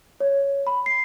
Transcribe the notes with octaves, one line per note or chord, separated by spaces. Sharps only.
C#5
B5
C7